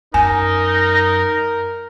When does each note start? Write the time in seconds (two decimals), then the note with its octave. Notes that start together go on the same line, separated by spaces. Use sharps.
0.14 F#2 D#4 A#4 G#5